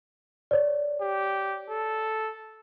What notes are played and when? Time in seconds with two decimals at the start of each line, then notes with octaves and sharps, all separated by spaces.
0.51 C#5 D5
1.02 G4
1.70 A4